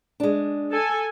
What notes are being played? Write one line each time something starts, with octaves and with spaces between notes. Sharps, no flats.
G#3 D4
A4 G#5